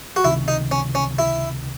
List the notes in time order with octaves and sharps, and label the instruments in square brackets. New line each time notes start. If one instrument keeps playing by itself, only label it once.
[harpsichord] F#4
[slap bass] C#2 C3 D#3 [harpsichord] E4
[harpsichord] D#4
C#4
C#4
E4